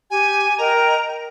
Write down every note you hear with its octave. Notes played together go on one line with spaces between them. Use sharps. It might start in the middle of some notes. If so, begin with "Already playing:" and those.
G4 G#5
A#4 D#5 G5 A#5